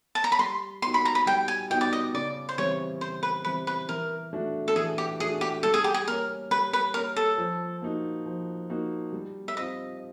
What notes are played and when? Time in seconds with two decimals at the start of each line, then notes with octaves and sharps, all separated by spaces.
0.15 A5
0.24 A#5
0.32 B5
0.39 G3 C6
0.82 B3 D#4 F#4 C6
0.94 B5
1.05 A#5
1.15 B5
1.26 G3 G5
1.48 G#5
1.70 B3 D#4 F#4 G5
1.81 D5
1.93 D#5
2.14 C#3 D5
2.49 C5
2.58 E3 G3 C4 C#5
3.01 C#3 C5
3.23 B4
3.45 E3 G3 C4 B4
3.67 B4
3.89 E3 A#4
4.33 A3 D4 F#4
4.68 A4
4.76 E3 G#4
4.98 G4
5.20 A3 D4 F#4 G#4
5.41 G4
5.63 G3 A4
5.74 G#4
5.84 G4
5.94 G#4
6.08 A#3 C#4 A#4
6.51 G3 B4
6.73 B4
6.94 A#3 C#4 A#4
7.16 A4
7.38 F3
7.82 A#3 D#4 F#4
8.26 F3
8.70 A#3 D#4 F#4
9.13 G3
9.48 E5
9.57 C4 F4 D#5